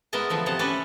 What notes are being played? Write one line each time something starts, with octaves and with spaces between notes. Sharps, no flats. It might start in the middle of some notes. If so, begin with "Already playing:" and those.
G#3 B3 E4 A#4 D#5 A5
D3 E3 F3 A3
C3 D#5 F#5 A5
C#4 E4 A4 B4 C#5 D5